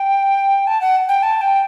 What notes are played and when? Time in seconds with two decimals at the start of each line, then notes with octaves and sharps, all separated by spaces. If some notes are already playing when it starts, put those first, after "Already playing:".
Already playing: G5
0.67 A5
0.81 F#5
1.09 G5
1.23 A5
1.41 G5